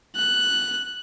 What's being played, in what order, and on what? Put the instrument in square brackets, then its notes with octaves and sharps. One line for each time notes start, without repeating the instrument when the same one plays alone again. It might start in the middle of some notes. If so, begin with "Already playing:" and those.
[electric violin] F#6